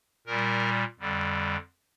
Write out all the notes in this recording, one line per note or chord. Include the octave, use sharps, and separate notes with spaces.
A#2 G3 A#4
F2 D3 G3